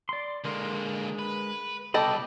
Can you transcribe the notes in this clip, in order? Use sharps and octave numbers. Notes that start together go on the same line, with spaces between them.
D5 C6
D3 G#3 A#3 A#4 C6
B4
C2 B2 A4 D#5 G5 B5 D6